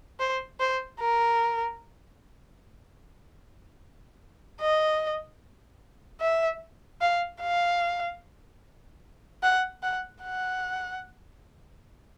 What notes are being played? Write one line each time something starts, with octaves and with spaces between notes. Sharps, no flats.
C5
C5
A#4
D#5
E5
F5
F5
F#5
F#5
F#5